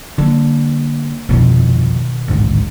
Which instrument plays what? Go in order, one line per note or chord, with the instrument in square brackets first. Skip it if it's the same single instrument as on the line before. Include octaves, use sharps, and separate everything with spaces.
[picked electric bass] D3 [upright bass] G3 A#3
[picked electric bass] G1 C2 F2 [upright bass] B2 D#3
[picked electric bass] A1 D2 G#2